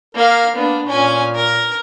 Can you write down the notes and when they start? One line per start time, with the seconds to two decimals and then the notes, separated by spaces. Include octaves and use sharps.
0.15 A#3 A#4 F5
0.56 A#3 B3 D4
0.86 A#2 C#4 G#5
1.35 A#4